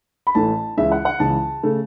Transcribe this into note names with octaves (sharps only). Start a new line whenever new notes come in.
B5
A1 A2 E3 A3 A5
C#2 C#3 E3 E5
F#5
F#5
C#2 C#3 E3 A5
C#3 A3